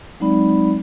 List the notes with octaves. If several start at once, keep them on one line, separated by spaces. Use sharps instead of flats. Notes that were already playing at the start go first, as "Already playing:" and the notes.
F#3 G#3 C4 D#4 D5 B5